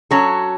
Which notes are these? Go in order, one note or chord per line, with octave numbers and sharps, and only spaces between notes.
F#3 C#4 F#4 A4